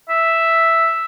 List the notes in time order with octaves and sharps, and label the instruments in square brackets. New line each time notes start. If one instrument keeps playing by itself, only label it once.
[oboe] E5